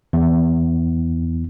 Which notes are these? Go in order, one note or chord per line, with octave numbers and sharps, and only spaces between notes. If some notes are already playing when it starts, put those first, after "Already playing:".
E2